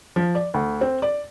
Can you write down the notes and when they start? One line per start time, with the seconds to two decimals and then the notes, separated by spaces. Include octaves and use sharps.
0.16 F3
0.35 D5
0.54 D2
0.81 C4
1.02 D5